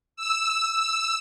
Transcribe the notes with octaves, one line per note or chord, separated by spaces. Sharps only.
E6
E6